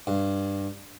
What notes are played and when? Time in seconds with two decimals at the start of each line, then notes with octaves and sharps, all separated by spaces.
0.07 G2